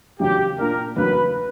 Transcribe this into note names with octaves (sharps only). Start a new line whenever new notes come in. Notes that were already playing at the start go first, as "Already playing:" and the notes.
E2 C#3 F#3 G4
A#2 A#3 D4 A#4
E2 C#3 F#3 B4